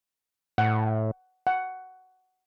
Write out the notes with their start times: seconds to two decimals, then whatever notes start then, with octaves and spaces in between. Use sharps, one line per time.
0.58 A2 F#5
1.47 F#5